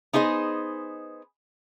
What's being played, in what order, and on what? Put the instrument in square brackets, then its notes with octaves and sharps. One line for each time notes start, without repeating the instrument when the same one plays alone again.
[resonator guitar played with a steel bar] B3 D#4 G#4 C5 D#5